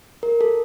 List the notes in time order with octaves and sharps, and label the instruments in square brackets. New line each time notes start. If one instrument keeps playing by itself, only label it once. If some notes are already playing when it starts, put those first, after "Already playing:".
[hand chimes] A#4
A4